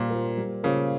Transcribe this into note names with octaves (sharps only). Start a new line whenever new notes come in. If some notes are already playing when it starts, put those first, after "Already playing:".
Already playing: A#2 G3 A#3 F4 C5
A#3 F4 C5
G3
C#3 A#3 F4 C5